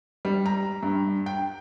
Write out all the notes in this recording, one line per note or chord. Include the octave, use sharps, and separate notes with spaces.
G3
A#5
G2
G5